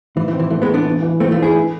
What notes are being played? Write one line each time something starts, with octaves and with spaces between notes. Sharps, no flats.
A2 E3
E3
C4
E3
E3 A3
G#3 B3
E3
B3 D4
E3
E3
E3 A3 C4
F3 A3
D4
E4 G#4
A3